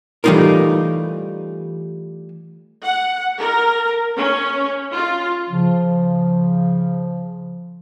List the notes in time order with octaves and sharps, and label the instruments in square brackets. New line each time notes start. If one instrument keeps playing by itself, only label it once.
[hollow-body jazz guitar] E3 G3 A3 D#4 F4 A#4
[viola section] F#5
A#4
C#4
F4
[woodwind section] C#3 F3